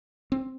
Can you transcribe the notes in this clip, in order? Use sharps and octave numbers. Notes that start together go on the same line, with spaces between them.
C4